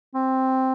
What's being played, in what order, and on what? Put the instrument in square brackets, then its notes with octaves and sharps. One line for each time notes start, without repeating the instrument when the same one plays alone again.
[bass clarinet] C4